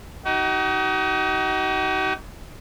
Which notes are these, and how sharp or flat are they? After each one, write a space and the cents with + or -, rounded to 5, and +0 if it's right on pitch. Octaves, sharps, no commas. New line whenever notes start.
D#4 +15 F#4 +45